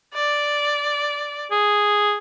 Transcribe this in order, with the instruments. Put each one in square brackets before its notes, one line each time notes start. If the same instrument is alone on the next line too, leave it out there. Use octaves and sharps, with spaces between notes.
[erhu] D5
[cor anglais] G#4